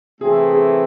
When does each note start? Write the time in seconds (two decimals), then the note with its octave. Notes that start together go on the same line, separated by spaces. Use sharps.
0.21 C3 E3 A3 C4 G#4
0.50 G#4